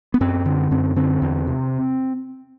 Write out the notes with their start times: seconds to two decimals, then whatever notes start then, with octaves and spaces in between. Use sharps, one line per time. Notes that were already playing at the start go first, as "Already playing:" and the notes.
0.14 B3
0.21 F#2 C4
0.46 D3
0.71 F#2 C4
0.96 D3 C4
1.22 E2
1.47 C3